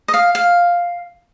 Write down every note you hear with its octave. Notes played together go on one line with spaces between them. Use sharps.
D#5
F5
F5